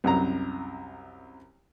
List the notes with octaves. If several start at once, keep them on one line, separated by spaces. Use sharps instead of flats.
C2 F#2 A#5